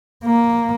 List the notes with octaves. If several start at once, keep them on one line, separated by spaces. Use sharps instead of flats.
A#3